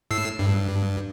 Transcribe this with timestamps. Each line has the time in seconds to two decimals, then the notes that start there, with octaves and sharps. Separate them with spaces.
0.11 A2 E6 C7
0.39 G2